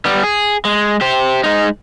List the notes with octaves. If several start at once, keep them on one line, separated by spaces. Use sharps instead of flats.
G3 B3
G#4
G#3
G4 C5
G#3 D#4